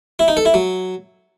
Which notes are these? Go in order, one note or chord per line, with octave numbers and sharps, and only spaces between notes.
E4
D#4
A4
E4
F#3